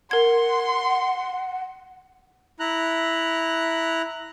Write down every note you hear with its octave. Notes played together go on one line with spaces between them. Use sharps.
A#4 F#5 C6 G#6
E4 A#5 F#6